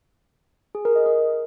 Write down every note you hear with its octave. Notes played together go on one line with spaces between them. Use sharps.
G#4
A#4
D#5
A#4